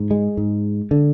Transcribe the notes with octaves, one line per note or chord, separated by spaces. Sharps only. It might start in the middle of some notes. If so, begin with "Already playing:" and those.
Already playing: G#2
G#3
G#2
D3